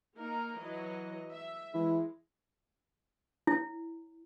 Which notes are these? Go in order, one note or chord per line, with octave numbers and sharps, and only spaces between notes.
A#3 D#4 A#4
E3 F#3 D#5
E5
E3 G#3 E4
E4